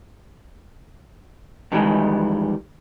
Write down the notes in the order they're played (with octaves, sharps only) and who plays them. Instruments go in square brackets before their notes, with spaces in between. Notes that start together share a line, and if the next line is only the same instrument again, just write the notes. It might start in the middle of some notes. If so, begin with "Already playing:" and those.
[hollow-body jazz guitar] F2 D#3 E3 G3 G#3